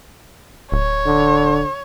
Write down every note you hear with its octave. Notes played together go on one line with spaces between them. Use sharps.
D1 C#5
D3